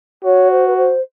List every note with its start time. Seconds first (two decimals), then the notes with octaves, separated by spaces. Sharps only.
0.24 F#4 C#5
0.50 C5
0.67 B4
0.77 C5